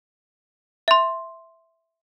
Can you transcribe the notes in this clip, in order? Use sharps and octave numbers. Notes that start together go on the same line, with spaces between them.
E5 C6